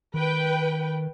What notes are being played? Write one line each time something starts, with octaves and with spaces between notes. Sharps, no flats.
D#3 B4 G5